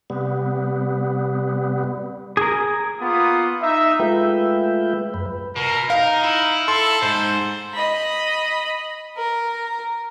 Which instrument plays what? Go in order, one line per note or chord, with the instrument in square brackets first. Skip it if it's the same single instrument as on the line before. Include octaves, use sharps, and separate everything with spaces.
[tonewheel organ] C3 G3 B3
[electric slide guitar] G#4 A#4
[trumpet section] A#3 B3 F4 D#6
D#4 E5
[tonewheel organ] G#3 A3 F4 B4 E5 G5
F#2 B4
[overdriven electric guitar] B2 [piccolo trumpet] A#4
[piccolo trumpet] D#4 [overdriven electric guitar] A#4 [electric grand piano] F5
[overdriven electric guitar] E4
[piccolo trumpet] A4 [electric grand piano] C6
[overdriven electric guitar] G#2 [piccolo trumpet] C5
[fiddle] D#5 B5
A#4